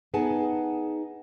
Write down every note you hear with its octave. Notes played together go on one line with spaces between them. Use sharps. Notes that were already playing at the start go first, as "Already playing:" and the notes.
B3 D#4 G#4 F#5 G#5 A5